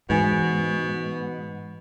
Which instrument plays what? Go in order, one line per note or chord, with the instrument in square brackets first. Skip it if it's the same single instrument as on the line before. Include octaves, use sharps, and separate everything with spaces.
[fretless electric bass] G#2 [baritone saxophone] B2 [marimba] E3 G#5